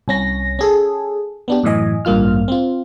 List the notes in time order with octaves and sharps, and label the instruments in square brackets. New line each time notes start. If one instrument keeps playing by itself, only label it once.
[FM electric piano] C2 C#4 A#6
C#4 G#4 A4
B3 D4 G4
F#2 A2 E3 D#5 G#5
A1 G2 A#3 F4 F6
C4 F4